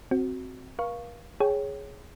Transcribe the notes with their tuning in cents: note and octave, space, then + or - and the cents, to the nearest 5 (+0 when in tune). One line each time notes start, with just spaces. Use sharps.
C4 +0 F#4 +0
A#4 +45 F5 +0 C#6 -5
G#4 +0 C#5 +0 G5 -15